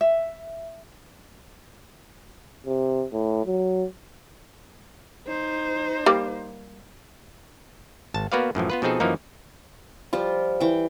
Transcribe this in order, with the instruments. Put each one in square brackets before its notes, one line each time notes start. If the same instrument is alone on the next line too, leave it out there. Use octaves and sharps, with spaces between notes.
[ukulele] E5
[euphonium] C3
A2
F#3
[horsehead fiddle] D#4 C5
[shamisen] G3 A#3
[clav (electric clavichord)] G#1 A5
A#3 B3 F#4 B4 D5 F5
F#2 A2 E3 F3
B3 F4 B4
B2 F3 C4 D#4 G#4 A4
F#2 E3 F3 A#3 D#4
[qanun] F3 G3 F4
E3 G5